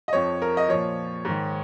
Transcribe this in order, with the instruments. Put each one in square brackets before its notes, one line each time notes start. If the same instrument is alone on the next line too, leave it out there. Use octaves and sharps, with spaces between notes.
[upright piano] D#5
F2 F3 C#5
A#4
D#5
A#2 F3 C#5
G#2 D#3